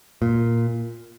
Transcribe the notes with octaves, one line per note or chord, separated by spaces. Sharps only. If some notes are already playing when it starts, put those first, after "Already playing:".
A#2